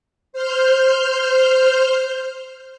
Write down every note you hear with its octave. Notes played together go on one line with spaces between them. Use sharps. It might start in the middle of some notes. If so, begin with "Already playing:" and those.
C5 F6 G6